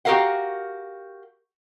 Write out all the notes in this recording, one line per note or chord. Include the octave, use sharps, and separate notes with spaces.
F#4 G4 A4 A#4 F5 F#5